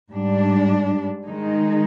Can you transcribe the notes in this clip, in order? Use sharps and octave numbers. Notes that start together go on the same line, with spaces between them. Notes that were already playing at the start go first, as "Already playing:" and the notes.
G#2 G3 D4
D#3 G#3 D#4